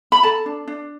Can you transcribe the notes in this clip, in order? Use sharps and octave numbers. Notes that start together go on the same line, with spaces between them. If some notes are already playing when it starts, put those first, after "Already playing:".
B5
A4 A5
D4
D4